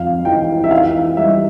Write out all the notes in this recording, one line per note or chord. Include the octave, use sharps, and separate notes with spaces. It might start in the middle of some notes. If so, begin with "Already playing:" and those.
Already playing: F2 F5
E3 G5
E5
E3 F5
G3 E5